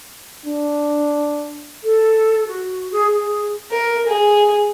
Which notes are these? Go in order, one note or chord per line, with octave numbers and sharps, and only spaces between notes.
D4
A4
F#4
G#4
G#4
A#4
G#4